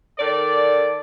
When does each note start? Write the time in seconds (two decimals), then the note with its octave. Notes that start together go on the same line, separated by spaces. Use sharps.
0.19 D#3 A4 D5